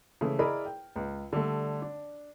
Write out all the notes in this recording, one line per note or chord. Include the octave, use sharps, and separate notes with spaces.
C#3 E3 A3 E4
E4 G#4 A#4 D5 D#5 B5
G5
C#2
D3 G3 A3
D4